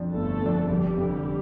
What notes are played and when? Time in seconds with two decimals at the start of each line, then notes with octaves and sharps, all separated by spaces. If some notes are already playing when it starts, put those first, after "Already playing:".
Already playing: F2 F3 D4
0.14 G1 A3 A4
0.41 F2 F3 D4
0.69 F1 G3 G4
0.98 F2 D3